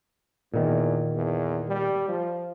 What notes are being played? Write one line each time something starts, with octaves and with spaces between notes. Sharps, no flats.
E2 A#2 D#3
E2
G3
F3